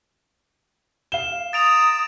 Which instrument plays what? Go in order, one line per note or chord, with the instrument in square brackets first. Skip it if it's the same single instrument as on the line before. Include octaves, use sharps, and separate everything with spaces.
[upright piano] F5 G7 [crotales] E7
[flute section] A#5 D#6 [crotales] A6 D7 F7